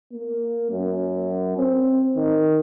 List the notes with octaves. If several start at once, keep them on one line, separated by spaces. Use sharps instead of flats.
A#3
F#2
C4
D#3